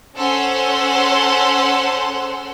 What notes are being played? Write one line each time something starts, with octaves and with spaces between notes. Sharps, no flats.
C#4 A4 C5 F#5 C6